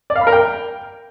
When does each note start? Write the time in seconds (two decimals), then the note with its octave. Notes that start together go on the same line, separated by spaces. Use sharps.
0.10 D5
0.16 F5
0.21 B5
0.27 A#4
0.32 G5